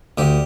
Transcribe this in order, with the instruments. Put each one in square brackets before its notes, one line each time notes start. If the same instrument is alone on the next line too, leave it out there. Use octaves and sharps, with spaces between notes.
[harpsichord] D2 G4